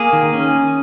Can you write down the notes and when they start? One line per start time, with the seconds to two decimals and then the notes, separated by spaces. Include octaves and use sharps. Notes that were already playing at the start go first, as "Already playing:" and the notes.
Already playing: A#3 G#4
0.13 D#3
0.33 C#4